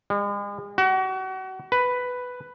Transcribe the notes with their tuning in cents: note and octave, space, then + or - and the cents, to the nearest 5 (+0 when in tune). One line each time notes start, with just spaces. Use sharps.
G#3 -45
F#4 +35
B4 +5